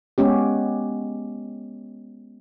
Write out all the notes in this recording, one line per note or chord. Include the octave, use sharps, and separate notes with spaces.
G#3 B3 C#4 G4